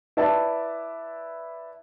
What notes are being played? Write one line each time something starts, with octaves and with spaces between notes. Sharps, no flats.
E4 B4 D5 A5